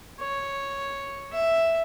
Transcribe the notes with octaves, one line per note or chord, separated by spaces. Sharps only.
C#5
E5